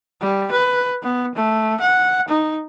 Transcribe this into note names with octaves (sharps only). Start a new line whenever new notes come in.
G3
B4
B3
A3
F#5
D#4